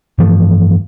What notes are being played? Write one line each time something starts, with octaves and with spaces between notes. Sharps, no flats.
G2 E3 F3 A3